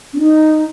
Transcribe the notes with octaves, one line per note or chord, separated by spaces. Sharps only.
C#4
D#4